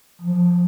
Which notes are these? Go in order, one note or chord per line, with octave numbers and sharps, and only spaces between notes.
F3